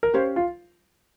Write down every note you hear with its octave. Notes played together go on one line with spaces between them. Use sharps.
A#4
C#4 G4 C5 C#5 F5
F4